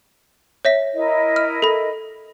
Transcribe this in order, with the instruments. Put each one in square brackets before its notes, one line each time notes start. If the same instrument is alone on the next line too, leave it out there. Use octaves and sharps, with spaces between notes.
[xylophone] C#5 E5 B6
[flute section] E4 A#4 D#5
[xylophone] F6
A4 B5